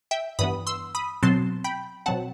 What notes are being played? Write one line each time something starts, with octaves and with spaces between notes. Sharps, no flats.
E5 G5
G2 E3 B3 B5 D#6
C6 E6
B5 D#6
B2 F#3 C4 A5 C6
G5 B5
B2 F#3 C4 F#5 A5